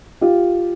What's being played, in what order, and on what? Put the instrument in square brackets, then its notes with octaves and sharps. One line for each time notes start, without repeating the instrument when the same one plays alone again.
[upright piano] F4 G4